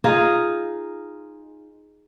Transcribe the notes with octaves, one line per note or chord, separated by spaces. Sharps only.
D#4 F4 G#4 D#5